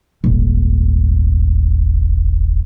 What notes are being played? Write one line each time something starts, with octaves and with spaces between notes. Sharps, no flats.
D#1 G#1